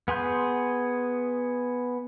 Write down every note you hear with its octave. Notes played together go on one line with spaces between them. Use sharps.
B3 G#4 C6 G6